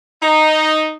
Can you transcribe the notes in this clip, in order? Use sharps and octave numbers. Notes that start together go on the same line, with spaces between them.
D#4